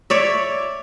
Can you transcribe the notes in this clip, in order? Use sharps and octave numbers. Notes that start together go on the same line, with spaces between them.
C#5 D5 E5